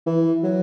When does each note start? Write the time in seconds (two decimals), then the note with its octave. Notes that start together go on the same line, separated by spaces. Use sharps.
0.06 E3
0.43 F#3